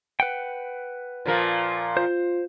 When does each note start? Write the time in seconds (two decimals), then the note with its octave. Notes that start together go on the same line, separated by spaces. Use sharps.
0.20 B4 F#5 G5
1.26 A#2 F3 A#4
1.97 F4 C5